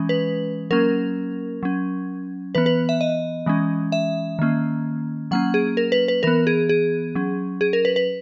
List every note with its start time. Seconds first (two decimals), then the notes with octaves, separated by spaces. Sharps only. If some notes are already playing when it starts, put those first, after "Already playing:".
Already playing: E3 G#3 C#4
0.09 B4
0.71 F#3 A#3 C#4 A#4
1.63 F#3 C#4
2.55 E3 B3 B4
2.66 B4
2.89 E5
3.01 D#5
3.46 E3 G#3 C#4
3.92 E5
4.39 D#3 A#3 C#4
5.31 F#3 A#3 C#4 F#5
5.54 G#4
5.77 A#4
5.92 B4
6.08 B4
6.23 E3 B3 A#4
6.47 G#4
6.69 G#4
7.15 F#3 C#4
7.61 G#4
7.73 A#4
7.85 B4
7.96 B4